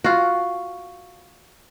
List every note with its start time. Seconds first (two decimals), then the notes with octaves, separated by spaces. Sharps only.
0.04 F4 F#4